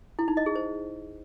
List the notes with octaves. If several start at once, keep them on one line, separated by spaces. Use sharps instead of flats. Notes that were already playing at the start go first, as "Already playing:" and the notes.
E4
D#4
D#5
G#4
C5